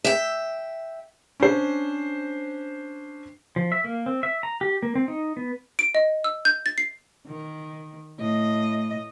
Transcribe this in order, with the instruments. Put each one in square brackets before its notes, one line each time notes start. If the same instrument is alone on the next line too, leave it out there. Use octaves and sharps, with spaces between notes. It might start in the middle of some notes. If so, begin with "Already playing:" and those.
[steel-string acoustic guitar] E5 G5
[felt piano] C#4 D4 C5
[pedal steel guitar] F3
E5
A#3
C4
E5
A#5
G4
A#3
C4
D#4
B3
[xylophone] D7
D#5
E6
G6
A6
C7
[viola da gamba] D#3
A2 D#5